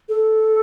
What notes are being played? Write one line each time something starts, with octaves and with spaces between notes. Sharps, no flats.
A4